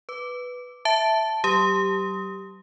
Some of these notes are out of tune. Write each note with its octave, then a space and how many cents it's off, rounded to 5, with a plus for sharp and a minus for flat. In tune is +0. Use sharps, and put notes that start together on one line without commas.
B4 +0 D6 +0
E5 +0 A5 +0
F#3 +45 G4 +0 D#6 +20